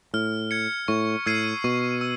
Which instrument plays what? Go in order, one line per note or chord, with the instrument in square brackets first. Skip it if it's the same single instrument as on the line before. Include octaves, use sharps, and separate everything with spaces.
[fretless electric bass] A2 [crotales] F6
[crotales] G#6 C#7
[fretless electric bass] A2 [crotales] C#6
[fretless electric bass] A2 [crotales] E6 G#6 C7 D#7
[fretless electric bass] B2 [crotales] C#6
[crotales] E6